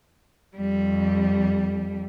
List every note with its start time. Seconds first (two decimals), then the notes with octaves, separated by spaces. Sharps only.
0.57 F2 G3